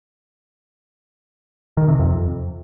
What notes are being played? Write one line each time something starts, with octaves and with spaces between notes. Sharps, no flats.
D#3
C3
F2